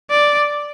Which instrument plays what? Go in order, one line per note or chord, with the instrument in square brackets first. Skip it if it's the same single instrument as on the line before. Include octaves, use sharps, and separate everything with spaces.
[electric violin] D5